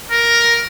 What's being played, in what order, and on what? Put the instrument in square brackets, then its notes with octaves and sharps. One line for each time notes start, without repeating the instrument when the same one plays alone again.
[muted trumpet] A#4